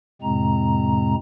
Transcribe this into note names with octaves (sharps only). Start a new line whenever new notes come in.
F2 A2 C3 G#3 C4 A#5